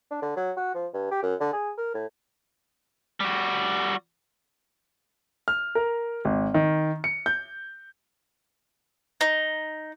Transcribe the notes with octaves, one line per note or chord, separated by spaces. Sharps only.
D4
D3
F#3
F#4
F3
G2
G4
F#2
D3
G#4
A#4
A2
G3 F#4
F6
A#4
G#1
D#3
C#7
G6
D#4